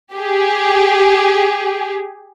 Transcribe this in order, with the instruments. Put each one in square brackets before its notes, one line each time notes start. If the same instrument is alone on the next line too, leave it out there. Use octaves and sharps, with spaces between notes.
[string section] G4 G#4